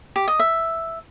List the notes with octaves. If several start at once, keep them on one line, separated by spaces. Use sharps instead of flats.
G4
D#5
E5